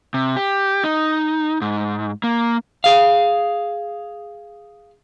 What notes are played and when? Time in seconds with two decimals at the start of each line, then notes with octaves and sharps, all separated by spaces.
0.14 C3
0.37 G4
0.84 D#4
1.62 G#2
2.24 A#3
2.84 G#4 F5